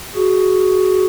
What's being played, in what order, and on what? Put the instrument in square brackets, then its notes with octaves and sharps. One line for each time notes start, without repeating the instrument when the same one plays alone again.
[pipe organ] F#4 G#4